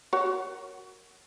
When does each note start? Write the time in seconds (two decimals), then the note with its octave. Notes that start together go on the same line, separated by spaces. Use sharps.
0.13 F#4 A#4 C#5